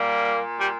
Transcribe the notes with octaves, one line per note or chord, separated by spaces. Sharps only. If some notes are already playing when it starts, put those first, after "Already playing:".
Already playing: A#2 G3 A#3
G3